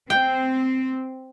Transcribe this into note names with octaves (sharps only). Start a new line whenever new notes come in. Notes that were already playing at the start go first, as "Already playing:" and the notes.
C4 G5